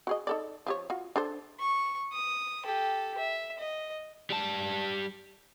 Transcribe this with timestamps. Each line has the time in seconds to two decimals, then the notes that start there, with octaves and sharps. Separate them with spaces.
0.07 F#4 G#4 D#5
0.27 D#4 A4 D5
0.66 F3 G4 C#5
0.90 F4 F#4
1.16 D4 A4 C5
1.60 C#6
2.13 D#6
2.64 G4 A4
3.18 E5
3.58 D#5
4.30 G3 A5